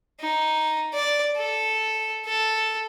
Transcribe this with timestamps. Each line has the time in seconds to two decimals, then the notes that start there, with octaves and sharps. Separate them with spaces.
0.21 D#4
0.94 D5
1.37 A4
2.26 A4